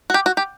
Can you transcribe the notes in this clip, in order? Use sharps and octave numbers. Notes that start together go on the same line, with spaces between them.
F#4
G4
F#4
G4